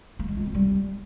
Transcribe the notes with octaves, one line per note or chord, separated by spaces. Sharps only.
A#3
G#3
F4
C4
G3